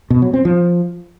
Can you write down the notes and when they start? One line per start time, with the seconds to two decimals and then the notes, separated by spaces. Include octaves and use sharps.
0.10 B2
0.22 F#3
0.33 C4
0.45 F3